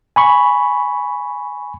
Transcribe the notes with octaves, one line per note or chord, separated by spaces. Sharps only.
G#5 B5 C#6